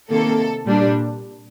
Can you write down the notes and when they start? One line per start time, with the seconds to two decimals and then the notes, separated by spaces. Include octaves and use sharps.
0.11 C3 D#3 A#3 A4
0.66 A#2 G3 D4